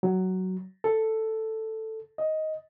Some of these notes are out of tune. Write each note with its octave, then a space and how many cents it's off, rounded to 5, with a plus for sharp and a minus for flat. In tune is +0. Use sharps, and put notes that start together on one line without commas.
F#3 +10
A4 +5
D#5 +10